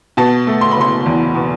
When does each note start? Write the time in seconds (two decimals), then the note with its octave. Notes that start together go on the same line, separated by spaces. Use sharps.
0.17 B2 A5
0.47 A3
0.61 C6
0.71 B5
0.76 F#1 C6
1.06 E2
1.35 B2